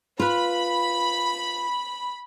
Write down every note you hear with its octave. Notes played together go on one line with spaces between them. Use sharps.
F4 B4 B5